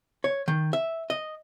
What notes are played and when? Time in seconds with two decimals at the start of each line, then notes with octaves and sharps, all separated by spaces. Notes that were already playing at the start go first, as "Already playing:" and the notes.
0.24 C#5
0.48 D#3
0.73 E5
1.10 D#5